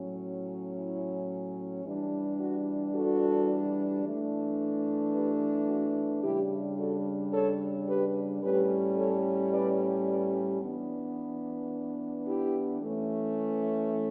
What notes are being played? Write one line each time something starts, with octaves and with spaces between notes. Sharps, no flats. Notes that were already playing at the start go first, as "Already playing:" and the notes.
Already playing: A2 F#3 C#4
E4
E3 G3 D4
F#4
F#4 A4
E3 A3 D4
G4 B4
F#4
C#3 G3 D4 E4 G4
F#4 A4
A4 C#5
G4 B4
A2 G3 C#4 G4 B4
A4 C#5
B4 D5
B4 D5
E3 B3 D4
E4 G4
E3 A3 C#4